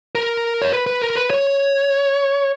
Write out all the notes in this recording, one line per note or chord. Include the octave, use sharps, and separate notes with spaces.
A#4
C#5
B4
B4
A#4
B4
C#5